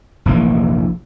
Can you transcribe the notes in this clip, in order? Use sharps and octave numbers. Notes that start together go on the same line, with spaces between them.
F1 A#1 E3 A#3